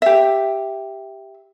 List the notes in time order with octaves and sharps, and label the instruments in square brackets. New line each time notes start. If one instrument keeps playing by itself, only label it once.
[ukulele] G4 E5